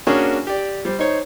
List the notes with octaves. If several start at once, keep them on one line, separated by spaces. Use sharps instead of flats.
A#3 C#4 D4 F#4 G#4 A#4
G4 D5
G3 C5
D#4 C5 C#5